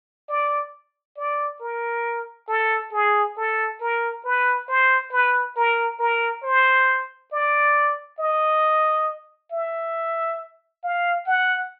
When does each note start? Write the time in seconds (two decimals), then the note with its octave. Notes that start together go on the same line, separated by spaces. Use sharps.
0.29 D5
1.17 D5
1.61 A#4
2.48 A4
2.93 G#4
3.37 A4
3.81 A#4
4.25 B4
4.68 C5
5.12 B4
5.56 A#4
6.00 A#4
6.43 C5
7.32 D5
8.19 D#5
9.52 E5
10.83 F5
11.26 F#5